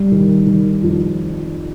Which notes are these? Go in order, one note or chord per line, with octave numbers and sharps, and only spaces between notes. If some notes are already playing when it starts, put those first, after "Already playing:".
Already playing: G3
D#3
D#3
F2